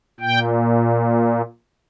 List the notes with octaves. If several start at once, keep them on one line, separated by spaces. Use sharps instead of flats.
A#2 G5